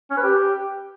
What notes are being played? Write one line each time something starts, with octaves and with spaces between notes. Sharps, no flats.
C#4
B4
G4